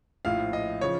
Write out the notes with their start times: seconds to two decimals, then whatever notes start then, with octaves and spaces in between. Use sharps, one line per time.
0.25 A#1 A2 F3 F5
0.53 D#5
0.81 C#3 F3 C#5